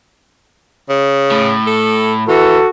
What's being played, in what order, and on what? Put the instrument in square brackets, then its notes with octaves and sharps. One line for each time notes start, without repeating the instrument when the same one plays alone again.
[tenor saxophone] C#3
[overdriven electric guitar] A2
[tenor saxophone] A4
[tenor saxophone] E3 [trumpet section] F#4 A4